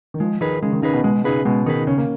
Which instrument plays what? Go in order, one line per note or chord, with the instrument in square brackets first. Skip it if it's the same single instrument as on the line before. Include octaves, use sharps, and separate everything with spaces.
[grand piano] D#3
[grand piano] F3 [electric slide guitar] G#3
[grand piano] D#3 [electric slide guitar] D#4 G#4 B4
[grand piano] C#3 [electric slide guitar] G#3
[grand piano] D#3
[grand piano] C#3 [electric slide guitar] D#4 G#4 B4
[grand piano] B2
[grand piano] B2 [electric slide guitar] G#3
[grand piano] C#3 [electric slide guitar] D#4 G#4 B4
[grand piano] B2 [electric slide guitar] G#3
[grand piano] D#3 [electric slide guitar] D#4 G#4 B4
[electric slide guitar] C#3 [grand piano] C#4
[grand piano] A#3